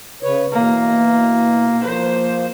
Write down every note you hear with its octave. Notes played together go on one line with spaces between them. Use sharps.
C#3 B4 C#5
B2 E3 A#3
F3 A#3 C5